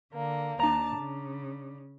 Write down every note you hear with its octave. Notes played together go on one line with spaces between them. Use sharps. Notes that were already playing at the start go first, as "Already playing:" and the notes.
D3 A#3
D#2 D4 A5 A#5
C#3